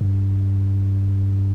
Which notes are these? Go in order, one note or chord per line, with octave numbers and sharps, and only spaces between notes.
G2